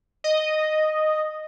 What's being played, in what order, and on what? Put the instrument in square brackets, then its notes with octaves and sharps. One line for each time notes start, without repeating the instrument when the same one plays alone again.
[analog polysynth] D#5